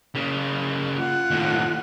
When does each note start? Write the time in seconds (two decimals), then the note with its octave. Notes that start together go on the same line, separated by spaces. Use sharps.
0.15 C#3 A#3
0.97 F4 F#5
1.30 D#2 A2